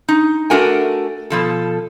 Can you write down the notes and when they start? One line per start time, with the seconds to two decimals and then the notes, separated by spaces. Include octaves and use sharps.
0.09 D#4
0.50 A3 D4 F#4 A#4 F#5 G#5
1.30 B2 F3 A4